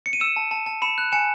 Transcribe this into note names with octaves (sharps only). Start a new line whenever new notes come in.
C#7
D#7
E6 C#7 E7
A5
A5
A5
B5 C#7 E7
F#6
G#5 C#7 E7